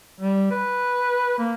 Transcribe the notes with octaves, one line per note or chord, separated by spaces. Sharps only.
G3
B4
A#3